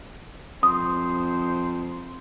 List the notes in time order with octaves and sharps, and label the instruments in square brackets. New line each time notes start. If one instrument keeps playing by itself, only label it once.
[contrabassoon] F2 [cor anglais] C5 [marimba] D#6